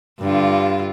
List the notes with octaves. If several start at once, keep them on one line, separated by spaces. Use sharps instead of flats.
G2 D3 F4